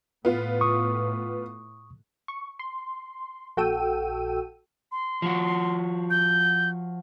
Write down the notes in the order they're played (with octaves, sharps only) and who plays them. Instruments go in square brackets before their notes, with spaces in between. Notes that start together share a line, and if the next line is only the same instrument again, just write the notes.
[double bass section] A2 [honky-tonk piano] B3 F4
[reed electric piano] C#6 D#6
[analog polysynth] C#6
C6
A#1 F#4 A4 G5 E6 D#7
[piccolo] C6
[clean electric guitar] F3 F#4
[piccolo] G6